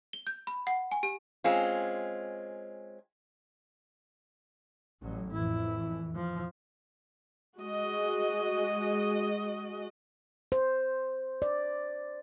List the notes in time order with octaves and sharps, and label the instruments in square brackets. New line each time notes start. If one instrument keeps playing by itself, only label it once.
[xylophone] G7
G6
B5
F#5
G#5
G4
[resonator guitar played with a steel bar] G#3 C4 C#4 F4
[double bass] A1 A2 [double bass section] F#3
[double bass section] F2 A2 E3 [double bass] E4
[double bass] F3
[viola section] G#3 F#4 D#5
[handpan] C5
D5